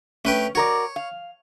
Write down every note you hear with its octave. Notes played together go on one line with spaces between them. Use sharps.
A3 C#4 B4 G5
F#4 A#4 C#5 D5
F5